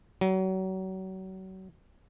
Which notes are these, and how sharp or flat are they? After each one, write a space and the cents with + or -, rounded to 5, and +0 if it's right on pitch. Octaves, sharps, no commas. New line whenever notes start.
F#3 +30